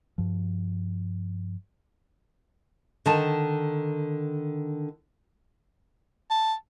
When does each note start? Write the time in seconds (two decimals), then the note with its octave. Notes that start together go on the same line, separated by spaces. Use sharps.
0.18 G2 F3
3.06 D3 D#3 A5
6.30 A5